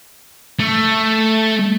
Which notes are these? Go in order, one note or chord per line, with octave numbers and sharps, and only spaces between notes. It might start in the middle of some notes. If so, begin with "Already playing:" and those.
A3